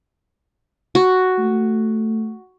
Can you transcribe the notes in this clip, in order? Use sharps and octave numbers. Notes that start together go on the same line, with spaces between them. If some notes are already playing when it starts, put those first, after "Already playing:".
F#4
A3